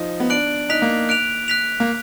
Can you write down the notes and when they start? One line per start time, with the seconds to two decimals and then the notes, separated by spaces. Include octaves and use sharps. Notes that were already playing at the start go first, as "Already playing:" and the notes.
Already playing: F3 D#4
0.20 B3
0.30 D4 F#6 D7 F#7
0.69 D#4 F#6 B6 F7
0.82 A#3
1.09 F#6 D7 F7
1.48 F#6 B6 F7
1.80 A#3